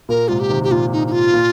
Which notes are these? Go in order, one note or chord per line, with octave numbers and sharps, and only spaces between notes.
A#2 A#4
G#2 C3 F4
G4
C3 D#3
G4
A#2 F4
D#4
D#4
F4
A#2